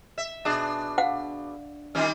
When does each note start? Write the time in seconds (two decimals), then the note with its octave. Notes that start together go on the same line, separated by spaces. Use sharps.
0.18 E5
0.45 B2 D4 G#4 A5
0.98 F5 F#5
1.95 D#3 G3 A#3 C#4 F4